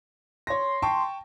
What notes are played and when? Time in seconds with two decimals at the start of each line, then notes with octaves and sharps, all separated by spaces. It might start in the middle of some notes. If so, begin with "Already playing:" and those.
0.47 C#5 C6 A#6
0.82 G5 A5 C#6